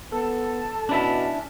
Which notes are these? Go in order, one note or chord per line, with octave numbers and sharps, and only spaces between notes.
B3 A4 A5
B2 C#4 D4 E4 E5